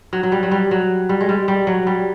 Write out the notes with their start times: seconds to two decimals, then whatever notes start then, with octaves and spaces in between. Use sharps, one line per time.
0.13 F#3
0.23 F#3
0.32 G3
0.43 F#3
0.51 G3
0.71 F#3
1.09 G3
1.21 G#3
1.29 G3
1.48 G3
1.67 F#3
1.87 G3